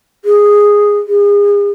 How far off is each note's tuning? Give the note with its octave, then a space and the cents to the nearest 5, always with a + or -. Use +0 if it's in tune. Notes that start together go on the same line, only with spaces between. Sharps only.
G#4 -5
G#4 -35